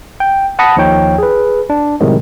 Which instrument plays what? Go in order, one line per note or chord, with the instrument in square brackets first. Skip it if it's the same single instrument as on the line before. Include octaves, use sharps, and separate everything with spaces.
[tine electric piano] G5
F#5 A5 B5 D#6 A#6 C#7
D#2 F3 D#4 C#5 G5
G#4 B4
D4
A2 C3 D#3 F#3 G#3